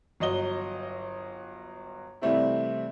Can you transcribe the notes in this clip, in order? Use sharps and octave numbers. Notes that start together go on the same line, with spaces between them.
G1 F#3 D#5 G7
C3 E3 G3 A3 C4 E4